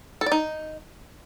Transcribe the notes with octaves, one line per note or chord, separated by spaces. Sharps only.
A4
D5
D#4